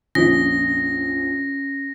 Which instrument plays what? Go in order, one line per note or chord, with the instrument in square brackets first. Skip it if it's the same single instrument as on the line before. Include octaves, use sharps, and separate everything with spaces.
[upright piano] A#1 F2 [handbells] C#4 [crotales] A#6